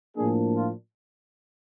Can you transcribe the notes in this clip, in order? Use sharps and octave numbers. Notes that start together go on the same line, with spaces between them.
A2 F3 A#3 D4 G#4
F4